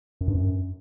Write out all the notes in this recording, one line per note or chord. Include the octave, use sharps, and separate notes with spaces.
F#2
G2
F#2